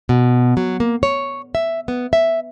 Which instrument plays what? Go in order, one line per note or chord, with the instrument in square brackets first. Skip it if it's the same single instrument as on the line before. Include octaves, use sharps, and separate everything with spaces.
[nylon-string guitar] B2
F#3
A#3
C#5
E5
B3
E5